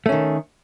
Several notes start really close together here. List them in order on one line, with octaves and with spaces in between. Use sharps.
A3 C#4 D#3